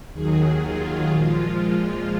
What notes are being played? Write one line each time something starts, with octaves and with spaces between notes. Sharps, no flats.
D#2 D#3 F#3 G#4
F4
A#2 F3 G#3